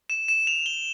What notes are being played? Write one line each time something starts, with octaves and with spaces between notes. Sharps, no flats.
E7
E7
F7
G7